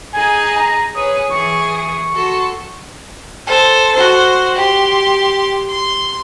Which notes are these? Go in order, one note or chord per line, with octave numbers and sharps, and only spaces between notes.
D#4 G#4 G#5
A#5
G#4 B4 C#5 D#6
E3 G#4 C#6
F#4 A4 C6
A4 C5
F#4 C5
G4 C6
C6